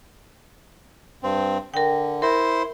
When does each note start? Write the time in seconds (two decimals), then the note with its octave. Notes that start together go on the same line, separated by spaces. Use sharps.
1.23 G2 C4
1.74 D3 A#4 G5
2.22 E4 A#4 C5 C6